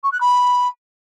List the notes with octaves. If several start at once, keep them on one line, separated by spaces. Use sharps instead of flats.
C#6
F#6
B5